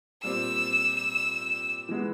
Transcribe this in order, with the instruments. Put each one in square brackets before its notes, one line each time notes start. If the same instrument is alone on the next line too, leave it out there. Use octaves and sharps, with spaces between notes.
[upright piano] A#2 G3 C4 [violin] E6
[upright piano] E3 G#3 B3